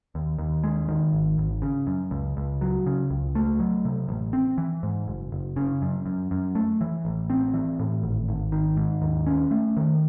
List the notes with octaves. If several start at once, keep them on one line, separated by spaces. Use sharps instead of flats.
D#2
D#2
G#3
D#3
G#1
G#1
C#3
F#2
C#2
C#2
F#3
C#3
C#2
A3
F#3
C3
A1
C4
E3
G#2
F#1
F#1
C#3
F#2
F#2
F#2
A3
E3
A1
C4
E3
A2
G#1
G#1
D#3
G#2
D#2
C#4
A3
D#3